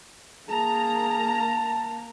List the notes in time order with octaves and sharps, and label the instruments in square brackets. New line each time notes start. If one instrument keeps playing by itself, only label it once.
[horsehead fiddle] A#3 [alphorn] G#4 [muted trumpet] A5 [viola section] A#5